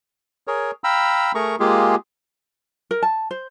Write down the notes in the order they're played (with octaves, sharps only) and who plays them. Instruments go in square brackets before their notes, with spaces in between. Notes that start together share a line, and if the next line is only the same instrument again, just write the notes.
[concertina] G#4 A#4 C#5
F5 G5 A#5 B5 E6
A3 G#4 A#4 A#5 C#6
G#3 A#3 F4 G4 G#4
[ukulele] A#4
A5
C5